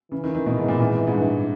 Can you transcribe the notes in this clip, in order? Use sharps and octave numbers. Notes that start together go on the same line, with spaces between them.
C#3 E3
D#3
D#3
B2
G#2
A#2
G#2
G#2
G2